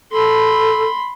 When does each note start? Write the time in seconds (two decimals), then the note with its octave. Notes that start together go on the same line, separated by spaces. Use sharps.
0.12 A4 B5 C6